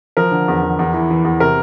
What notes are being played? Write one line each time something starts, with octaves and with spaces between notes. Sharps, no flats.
F3 A#4
D3
E2
E2
E2
E3
E3
E2
C3 A#4